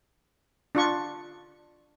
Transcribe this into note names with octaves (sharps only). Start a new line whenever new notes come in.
D4 F4 C#6